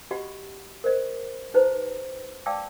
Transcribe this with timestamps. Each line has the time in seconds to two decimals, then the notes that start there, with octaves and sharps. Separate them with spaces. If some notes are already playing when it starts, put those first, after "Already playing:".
0.11 F#4 G4 D#5 F#5 B5 C#6
0.84 A#4 C5 D#5
1.54 D#4 G4 B4 C5 A#5
2.46 D5 F5 G5 A5 D6 E6